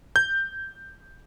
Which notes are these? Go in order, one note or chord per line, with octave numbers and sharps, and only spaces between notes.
G6